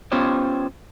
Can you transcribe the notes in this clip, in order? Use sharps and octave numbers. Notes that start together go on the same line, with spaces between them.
B3 C#4 F4 G4 C5 C#5